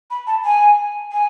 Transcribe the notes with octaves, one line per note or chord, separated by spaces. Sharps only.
B5
A5
G#5
G#5